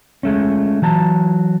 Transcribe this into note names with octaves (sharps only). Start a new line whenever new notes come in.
G#3 A3 C#4
E3 F#3 A5 A#5